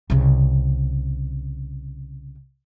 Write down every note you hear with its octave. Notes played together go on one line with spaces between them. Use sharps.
C2 C#3